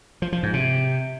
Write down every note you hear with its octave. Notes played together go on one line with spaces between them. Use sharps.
F3
F3
G#2
C3